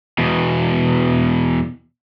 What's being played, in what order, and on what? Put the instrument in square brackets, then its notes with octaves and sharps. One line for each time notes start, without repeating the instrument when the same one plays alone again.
[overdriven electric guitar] E2 B2